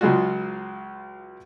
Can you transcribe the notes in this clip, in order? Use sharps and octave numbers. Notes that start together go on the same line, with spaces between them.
C#2 C#3 F#3 G#3 F4 F#4